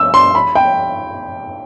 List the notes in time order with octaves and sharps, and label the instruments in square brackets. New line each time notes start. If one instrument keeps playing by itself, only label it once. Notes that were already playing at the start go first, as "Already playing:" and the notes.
Already playing: [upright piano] E6
C6
B5
G5